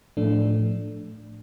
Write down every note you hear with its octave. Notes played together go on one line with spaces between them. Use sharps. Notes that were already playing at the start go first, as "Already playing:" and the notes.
A2 F3 A3 D4